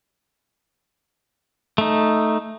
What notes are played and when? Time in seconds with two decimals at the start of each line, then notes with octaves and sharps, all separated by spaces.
1.78 A3 D#4